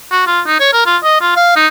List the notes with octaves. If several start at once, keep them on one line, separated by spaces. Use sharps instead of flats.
F#4
F4
D#4
C#5
A#4
F4
D#5
F4
F5
D#4